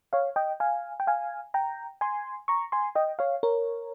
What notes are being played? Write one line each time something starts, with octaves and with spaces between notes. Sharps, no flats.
C#5 F5
D#5 G5
F5 G#5
G5
F5 G#5
G5 A#5
G#5 C6
A#5 C#6
G#5 C6
D#5 G5
C#5 F5
A#4 C#5